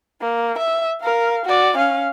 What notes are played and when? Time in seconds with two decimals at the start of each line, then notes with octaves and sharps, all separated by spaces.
0.21 A#3
0.59 E5
1.02 A#4 F5
1.46 F#4 D5
1.77 C#4 F5